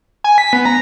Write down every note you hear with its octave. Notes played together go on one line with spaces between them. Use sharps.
G#5
B6
B3
A#5